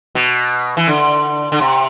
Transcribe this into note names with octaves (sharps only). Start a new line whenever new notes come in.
B2
E3
D3
D3
C3